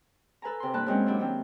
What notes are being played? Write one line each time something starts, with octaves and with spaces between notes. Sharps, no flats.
A4 B4 G#5 A#5
C3 C6
G2 A#3 C4 A5 B5 F#6
F#2 G#3 C4 C#4
F#3 C#4 D4 E4 G4
D#3 C4